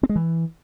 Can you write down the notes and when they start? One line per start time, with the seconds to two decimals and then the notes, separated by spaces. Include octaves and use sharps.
0.03 C4
0.09 G#3
0.16 E3